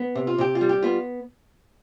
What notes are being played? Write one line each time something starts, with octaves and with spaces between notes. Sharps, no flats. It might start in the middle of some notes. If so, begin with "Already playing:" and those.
Already playing: B3
C3
F4
C3 G4
F4
G3
G4
B3 F4